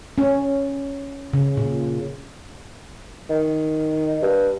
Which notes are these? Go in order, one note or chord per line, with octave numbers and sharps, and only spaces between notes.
C#4
C#3
A#2
D#3
G2